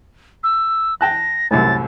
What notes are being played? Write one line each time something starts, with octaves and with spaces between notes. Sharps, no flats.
E6
G5 A5 F#6 A#6
C2 F#2 A2 A6